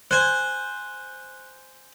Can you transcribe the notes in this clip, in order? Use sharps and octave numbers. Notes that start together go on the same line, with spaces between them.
C5 G#5 F#6